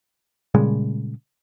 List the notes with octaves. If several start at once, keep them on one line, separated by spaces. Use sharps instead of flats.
A#2 C#3 G3 G#3